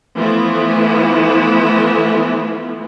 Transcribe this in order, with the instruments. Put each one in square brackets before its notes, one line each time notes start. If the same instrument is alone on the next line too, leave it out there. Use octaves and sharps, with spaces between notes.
[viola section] E3 F3 A3 B3 E4